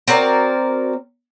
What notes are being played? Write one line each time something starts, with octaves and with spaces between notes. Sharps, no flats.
C4 F#4 A#4 D5